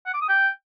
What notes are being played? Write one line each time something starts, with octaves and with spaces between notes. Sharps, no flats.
F#5
D6
D#6
G5